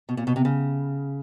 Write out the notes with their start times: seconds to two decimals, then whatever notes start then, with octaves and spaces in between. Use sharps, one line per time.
0.09 B2
0.17 A#2
0.27 B2
0.36 C3
0.45 C#3